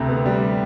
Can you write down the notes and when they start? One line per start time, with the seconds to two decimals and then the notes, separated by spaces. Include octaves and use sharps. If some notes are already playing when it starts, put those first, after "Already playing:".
Already playing: D2 C3
0.09 B3
0.26 G3